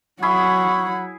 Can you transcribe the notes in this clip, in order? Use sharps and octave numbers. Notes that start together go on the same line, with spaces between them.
F#3 E4 G#4 F#5 B5 C#6